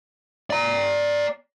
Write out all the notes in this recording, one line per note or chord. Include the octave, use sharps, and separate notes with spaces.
D5 A#5